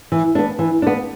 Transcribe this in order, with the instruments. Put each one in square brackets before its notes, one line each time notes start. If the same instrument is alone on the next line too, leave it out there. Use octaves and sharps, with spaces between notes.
[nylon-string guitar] E3
B3 D4
E3
B3 D4